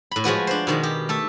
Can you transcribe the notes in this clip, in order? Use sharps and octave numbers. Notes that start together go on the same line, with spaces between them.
A2 B5
F3 G#3 F#4 B4
D4 C5
B2 D#3 G#3
G4
A3 A4 E5